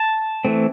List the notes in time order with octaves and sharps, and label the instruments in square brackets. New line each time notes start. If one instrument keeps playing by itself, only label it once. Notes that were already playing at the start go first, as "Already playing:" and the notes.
Already playing: [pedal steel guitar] A5
E3 A3 C4